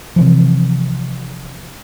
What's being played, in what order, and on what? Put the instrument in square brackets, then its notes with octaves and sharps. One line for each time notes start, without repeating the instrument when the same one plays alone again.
[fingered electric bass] C3 E3 F3